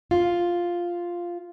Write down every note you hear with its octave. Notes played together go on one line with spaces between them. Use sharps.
F4